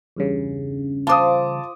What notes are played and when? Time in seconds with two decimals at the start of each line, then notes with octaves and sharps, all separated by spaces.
0.16 E2 G2 C#3
1.07 F4 C5 A5 D6 D#6